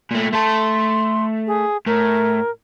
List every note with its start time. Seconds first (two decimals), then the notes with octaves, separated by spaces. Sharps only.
0.11 A#2 A3
0.33 A3 A4 C6
1.47 G#4
1.86 A2 A#4